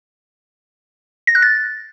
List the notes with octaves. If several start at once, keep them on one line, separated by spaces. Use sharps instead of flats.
A#6
F#6
A6